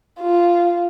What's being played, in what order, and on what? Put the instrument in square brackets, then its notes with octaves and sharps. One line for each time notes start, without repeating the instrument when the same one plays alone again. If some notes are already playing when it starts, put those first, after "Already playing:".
[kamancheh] F4